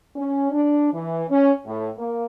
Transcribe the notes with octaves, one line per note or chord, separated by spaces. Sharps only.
C#4
D4
E3
C#4
A2
A#3